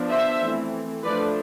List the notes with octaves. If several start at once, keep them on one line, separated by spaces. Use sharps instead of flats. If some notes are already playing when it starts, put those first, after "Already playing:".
Already playing: F3 B3 D4
C5 E5
E3 A3 C4
F3 A3 D4 B4 D5